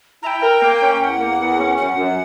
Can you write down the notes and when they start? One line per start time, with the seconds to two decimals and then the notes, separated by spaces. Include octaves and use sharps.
0.23 E4 G5 A#5
0.41 A#4
0.61 A#3
0.80 C#4
0.99 E2 G5
1.04 F#5
1.19 A#3
1.38 E2
1.58 C#4
1.77 F#2 F#5
1.96 F#2